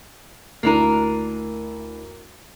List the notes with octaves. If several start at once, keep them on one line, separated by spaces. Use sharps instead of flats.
D2 A#3 D4 E4 A#4 D#7